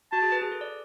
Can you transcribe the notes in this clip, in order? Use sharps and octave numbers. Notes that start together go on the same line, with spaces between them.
F#4 A5
G#4
B4
G#4
A4
D5